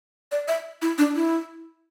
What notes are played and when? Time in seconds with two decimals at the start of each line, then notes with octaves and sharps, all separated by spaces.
0.32 D5
0.48 E5
0.82 E4
0.98 D4
1.15 E4